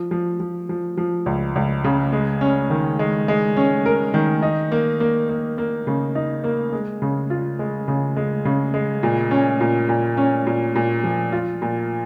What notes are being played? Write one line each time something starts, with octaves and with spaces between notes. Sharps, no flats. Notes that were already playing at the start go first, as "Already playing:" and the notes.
Already playing: F3
F3
F3
F3
F3
C#2
C#2
C#3
G#3
C#4
D#3
G#3
G#3
C#4
A#4
D#3
D#4
A#3
A#3
A#3
A#3
C#3
D#4
A#3
G#3
C#3
F4
G#3
C#3
G#3
C#3
G#3
A#2
C#4
A#2
A#2
C#4
A#2
A#2
F3
F4
A#2